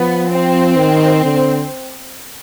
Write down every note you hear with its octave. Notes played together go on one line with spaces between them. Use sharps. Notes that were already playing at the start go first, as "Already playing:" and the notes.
Already playing: F3 B3
C4
D#3
D3